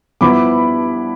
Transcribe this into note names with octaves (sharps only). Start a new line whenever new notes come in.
G2 F3 B3 E4 B5 D6